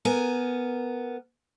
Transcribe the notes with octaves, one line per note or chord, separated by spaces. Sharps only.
B3 A#4 G#5